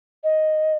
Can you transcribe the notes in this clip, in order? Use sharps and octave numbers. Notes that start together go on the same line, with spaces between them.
D#5